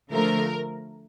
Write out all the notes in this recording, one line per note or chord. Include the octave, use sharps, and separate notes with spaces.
D3 F3 A3 A#4